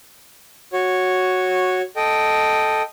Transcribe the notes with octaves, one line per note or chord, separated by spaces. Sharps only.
F#4 C#5
A4 D#5 G5